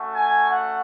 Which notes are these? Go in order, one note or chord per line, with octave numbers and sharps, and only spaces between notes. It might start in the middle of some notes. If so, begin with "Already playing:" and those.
Already playing: A3 C#4 F#4
G#5
F#5